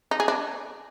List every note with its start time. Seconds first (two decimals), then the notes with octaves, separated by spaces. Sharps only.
0.11 D#4
0.20 G#4
0.28 D4